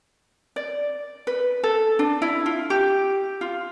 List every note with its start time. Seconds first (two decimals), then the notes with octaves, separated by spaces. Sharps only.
0.56 D5
1.27 B4
1.63 A4
1.99 D4
2.22 E4
2.46 F4
2.70 G4
3.41 F4